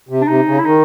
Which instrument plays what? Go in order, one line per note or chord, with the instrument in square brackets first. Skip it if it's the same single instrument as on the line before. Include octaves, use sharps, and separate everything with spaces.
[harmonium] C3
[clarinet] D4
[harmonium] C3 [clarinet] D#4
[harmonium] C#3
[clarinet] E4
[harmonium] D#3 [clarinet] D#4